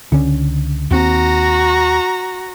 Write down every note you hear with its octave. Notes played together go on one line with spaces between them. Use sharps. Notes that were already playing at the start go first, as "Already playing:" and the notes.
C#2 D3 C#4
D#2 C4 F#4 A#5